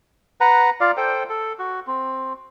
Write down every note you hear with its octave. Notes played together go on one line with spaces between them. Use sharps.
B4 F#5 A#5
F4 D5 F5
A4 C5 G5
A4
F#4
C4